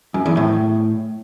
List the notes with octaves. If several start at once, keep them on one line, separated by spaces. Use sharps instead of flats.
F#2
E2
A2